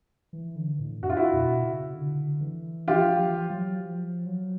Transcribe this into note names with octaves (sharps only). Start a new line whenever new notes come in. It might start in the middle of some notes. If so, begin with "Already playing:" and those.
E3
D3
A2
F2 F#4
F4
E4 F#4
B2
C#3
D3
E3
F3 F4 G4
F3
E3
F3
F#3
F3
F#3